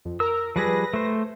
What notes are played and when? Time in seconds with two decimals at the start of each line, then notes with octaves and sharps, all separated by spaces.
0.05 F2
0.20 A#4 A#5 E6
0.56 F3 G3 G#4 B4 A#6
0.94 A3 C5